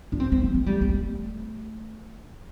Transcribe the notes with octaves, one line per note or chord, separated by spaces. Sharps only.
D4
C4
C4
F3
A3
G3
B3
A3